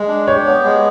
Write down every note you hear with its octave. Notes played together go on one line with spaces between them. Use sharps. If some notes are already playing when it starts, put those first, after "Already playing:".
Already playing: G#3
D4
G4 C#5
B3
G#3